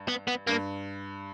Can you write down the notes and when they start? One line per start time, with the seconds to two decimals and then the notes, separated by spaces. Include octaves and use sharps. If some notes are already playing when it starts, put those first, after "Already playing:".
Already playing: G2
0.08 B3
0.28 B3
0.47 G2 A#3